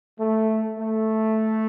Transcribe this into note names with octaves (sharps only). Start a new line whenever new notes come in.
A3
A3